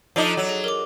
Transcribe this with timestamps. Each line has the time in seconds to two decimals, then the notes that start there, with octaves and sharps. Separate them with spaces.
0.16 F3 D4 D#4 A4 D6 C7
0.37 F#3
0.49 G#4
0.64 A#4 D6